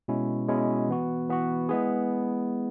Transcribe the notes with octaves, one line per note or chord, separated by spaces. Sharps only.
B2 G#3 C#4 E4
B2 G#3 C#4 E4
E3 B3 F#4
E3 B3 F#4
G#3 B3 E4 G#4